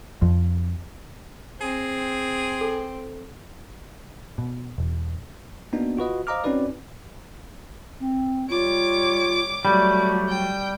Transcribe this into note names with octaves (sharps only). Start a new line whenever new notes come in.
F2
C4 G#4
A4
B2
E1
A#3 B3 D4 D#4 F#4
F4 F#4 B4 D#5
C5 D#5 F5 A#5 D6 F6
C4 C#4 D#4 F#4 B4 D5
C4
G3 F4 C#5 D6
F#3 G3 A3 F#4
G5